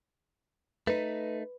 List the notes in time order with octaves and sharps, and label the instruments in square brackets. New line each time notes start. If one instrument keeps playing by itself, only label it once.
[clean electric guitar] A3 D#4 [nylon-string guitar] B4